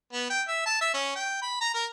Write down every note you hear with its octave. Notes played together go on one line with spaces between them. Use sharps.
B3
G5
E5
A5
E5
C#4
G5
B5
A#5
A#4